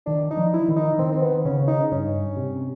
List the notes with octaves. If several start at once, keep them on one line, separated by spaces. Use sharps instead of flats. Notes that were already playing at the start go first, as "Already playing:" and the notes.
D#3 D4
D#4
F3
E4
D#3
D#4
D#3 C4
C4
B3
C#3 C#4
D#4
G2 C#4
C3